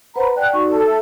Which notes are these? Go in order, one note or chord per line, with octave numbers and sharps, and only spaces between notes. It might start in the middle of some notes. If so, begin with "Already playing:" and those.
B4 C5 F#5 A#5 B5
D5 F#5 G5 A5 F#6
D#4 F#4 D5 C#6
A4
E5